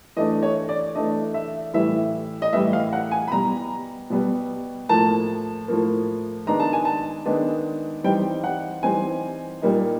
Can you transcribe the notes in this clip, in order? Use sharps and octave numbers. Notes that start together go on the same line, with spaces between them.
E3 A3 D4 D#5
C#5
D5
E3 A3 D4 D#5
E5
A2 E3 G3 E5
D#5
A2 E3 G3 E5
F5
F#5
G#5
B5
B2 G3 B3 A#5
B2 G3 B3
A2 F3 A#3 A5
A2 F3 A#3
D#3 G#3 B3 D4 A#5
A5
G#5
A5
D#3 G#3 B3 D4
E3 G3 C4 D#4 G5
F#5
E3 G3 C4 D#4 G#5
A#2 G3 A#3 D#4